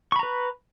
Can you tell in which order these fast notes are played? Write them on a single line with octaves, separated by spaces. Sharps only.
C#6 B5 A#5 B4